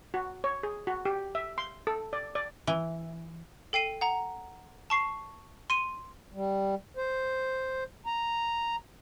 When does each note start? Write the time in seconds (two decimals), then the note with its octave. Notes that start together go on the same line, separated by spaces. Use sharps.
0.14 F#4
0.44 C#5
0.63 G#4
0.87 F#4
1.05 G4
1.35 E5
1.58 C6
1.87 A4
2.13 D5
2.35 D5
2.67 E3
3.73 A4 G5 C7 D#7
4.01 F#5 A#5
4.90 A5 C#6 C7
5.70 C6 D#7
6.34 G3
6.97 C5
8.06 A#5